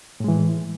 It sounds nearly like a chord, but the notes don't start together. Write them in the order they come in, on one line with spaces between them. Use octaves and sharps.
A2 G#3 E3